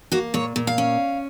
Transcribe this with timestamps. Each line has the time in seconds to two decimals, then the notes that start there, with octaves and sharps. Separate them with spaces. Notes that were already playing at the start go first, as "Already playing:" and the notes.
0.12 A#3 F#4
0.34 A#2 C#5
0.56 A#2
0.67 F5
0.78 C#4